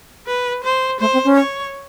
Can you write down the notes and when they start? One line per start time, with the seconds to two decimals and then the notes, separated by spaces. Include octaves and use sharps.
0.27 B4
0.64 C5
1.00 A3 C5
1.13 C4
1.25 C#4
1.37 C#5